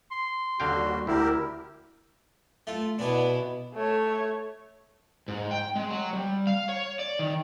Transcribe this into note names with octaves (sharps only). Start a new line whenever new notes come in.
C6
D#2 D3 G3 F#4 F5 G5
D2 E4 G4 A#4
A3 F4
B2 B3 D4 E4 G#5
A3 C#5
G#2
G5
G#3
F#3
G3
F5
C#5
D5
D#3